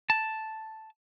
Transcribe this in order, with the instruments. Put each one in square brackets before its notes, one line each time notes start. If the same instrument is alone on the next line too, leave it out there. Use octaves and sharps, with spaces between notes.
[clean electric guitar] A5